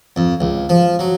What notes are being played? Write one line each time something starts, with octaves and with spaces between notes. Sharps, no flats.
F2
C#2
F3
F#3